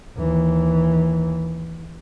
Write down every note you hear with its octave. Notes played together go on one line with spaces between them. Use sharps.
D#2 E3